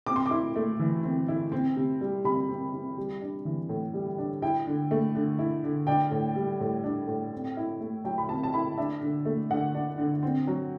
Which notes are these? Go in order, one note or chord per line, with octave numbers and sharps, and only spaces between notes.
C4 D6
C6
E4 D6
A3
E3
C4
E4
C4
C3
G3
C3 B5
C4
C3
G3
D4
E3
A2
G3
D4
E4 G5
D3
A3
D3
E4
D3
D4 G5
A2
G3
A2
D4
A2
C4
E4
A3
F#3 G5
B5
C4 A5
A5
E4 B5
D4 E5
D3
A3
D3 F#5
D4
D3
C4
F#3